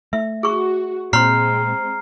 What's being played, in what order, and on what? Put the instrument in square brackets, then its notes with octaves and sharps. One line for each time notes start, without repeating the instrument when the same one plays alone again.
[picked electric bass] A3 [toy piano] E5
[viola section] F#4 [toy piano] G#4 C#6
[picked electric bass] A#2 [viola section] G#3 C4 [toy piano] C#5 C6 [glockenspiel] A#5 F6 C7